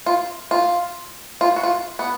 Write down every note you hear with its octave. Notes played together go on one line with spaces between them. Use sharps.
F4
F4
F4
F#4
F4
B3